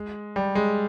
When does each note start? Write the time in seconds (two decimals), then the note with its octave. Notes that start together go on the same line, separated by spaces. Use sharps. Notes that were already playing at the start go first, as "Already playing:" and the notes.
Already playing: G#3
0.36 G3
0.55 G#3